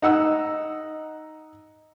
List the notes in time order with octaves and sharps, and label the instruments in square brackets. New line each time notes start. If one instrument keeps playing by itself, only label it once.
[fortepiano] D#4 F#5 E6